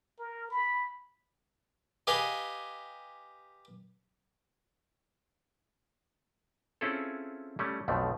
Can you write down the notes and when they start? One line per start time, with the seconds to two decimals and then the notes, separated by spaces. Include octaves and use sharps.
0.19 A#4
0.51 B5
2.07 G4 B4 D#5 F5 G#5
6.81 C4 C#4 E4 F4 G#4 A4
7.59 G3 A3 C#4
7.88 B1 F2 B2 F3 A3